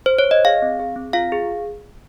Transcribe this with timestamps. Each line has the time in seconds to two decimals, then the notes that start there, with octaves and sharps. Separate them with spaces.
0.06 C5
0.19 C#5
0.31 D#5
0.45 G#4 F5
0.62 C4
0.79 G#4
0.96 C4
1.13 F4 F5
1.32 G#4